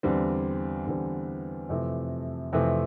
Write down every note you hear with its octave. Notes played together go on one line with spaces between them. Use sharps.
E2 D3 G3 C4
E2 D3 G3 C4
F2 C3 E3 A3
F2 C3 E3 A3